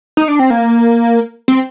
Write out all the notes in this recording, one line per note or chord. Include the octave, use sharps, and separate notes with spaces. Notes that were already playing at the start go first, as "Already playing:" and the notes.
D#4
D4
C4
A#3
C4